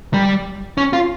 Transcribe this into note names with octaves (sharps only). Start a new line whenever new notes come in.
G3
C#4
F4